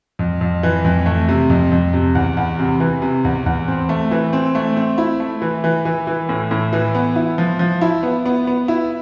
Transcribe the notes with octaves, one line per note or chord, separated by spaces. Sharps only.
F2
F2
E3
F2
A3
C3
F2
F2
C3
E2
E2
C3
E3
C3
E2
E2
C4
A3
E3
C4
A3
C4
E4
A3
E3
E3
E3
E3
A2
A2
E3
B3
E4
F3
F3
E4
B3
B3
B3
E4